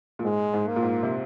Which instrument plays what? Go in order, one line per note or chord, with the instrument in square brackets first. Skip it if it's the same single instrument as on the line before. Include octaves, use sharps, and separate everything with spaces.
[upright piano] A#2
[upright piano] G#2 [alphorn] G#3
[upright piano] G#2
[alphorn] A#3
[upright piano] A#2
G#2
C3